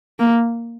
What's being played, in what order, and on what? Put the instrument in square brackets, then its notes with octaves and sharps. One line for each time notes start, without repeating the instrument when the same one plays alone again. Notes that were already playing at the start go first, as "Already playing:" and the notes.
[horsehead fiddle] A#3